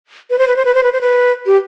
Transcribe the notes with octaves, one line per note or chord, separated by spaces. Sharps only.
B4
C5
B4
C5
B4
C5
B4
C5
B4
G4